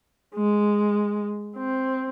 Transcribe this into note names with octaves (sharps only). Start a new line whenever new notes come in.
G#3
C4